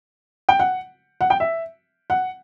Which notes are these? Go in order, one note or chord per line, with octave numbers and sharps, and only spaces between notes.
G5
F#5
F#5
G5
E5
F#5